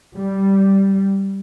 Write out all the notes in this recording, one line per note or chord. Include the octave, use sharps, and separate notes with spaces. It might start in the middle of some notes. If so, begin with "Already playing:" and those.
G3